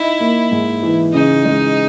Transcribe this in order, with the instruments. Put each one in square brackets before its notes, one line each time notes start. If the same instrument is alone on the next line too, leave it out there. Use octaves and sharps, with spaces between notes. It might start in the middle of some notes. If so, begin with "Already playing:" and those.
Already playing: [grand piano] D#4 [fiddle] E4
[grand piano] A#3
G#2
E3
[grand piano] C#3 [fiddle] D#4
[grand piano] G#3